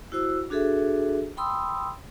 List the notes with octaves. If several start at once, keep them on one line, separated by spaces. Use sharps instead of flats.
E4 F#4 C5 E6
D4 F#4 G#4 A4 E5
G5 B5 C6 D#6 E6